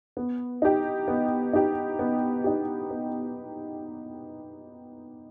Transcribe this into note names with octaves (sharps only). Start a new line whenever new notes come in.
B3
D#4 G4
B3
D#4 G4
B3
D#4 G4
B3